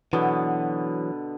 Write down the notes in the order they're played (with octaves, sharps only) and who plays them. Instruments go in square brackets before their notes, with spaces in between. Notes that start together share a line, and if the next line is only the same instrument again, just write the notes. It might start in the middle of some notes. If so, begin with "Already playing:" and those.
[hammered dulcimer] B2 D3 B3 [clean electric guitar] E3 F#3